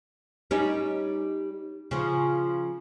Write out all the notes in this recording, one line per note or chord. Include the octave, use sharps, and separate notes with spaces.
G3 C#4 D#4
C#3 F3